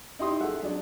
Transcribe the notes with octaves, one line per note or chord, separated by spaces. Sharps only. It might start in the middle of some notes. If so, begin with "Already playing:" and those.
D#4 E4 G4 C6 D#6
A3 G#4 E5 F#5
F#3 D4